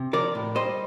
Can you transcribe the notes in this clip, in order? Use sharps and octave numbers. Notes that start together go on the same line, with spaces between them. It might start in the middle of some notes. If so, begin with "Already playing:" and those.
Already playing: C3
F3 A#4 D5
A2
G3 C5 D#5